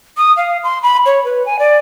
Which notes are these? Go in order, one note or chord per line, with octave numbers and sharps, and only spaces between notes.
D#6
F5
C6
B5
C#5
B4
G#5
D5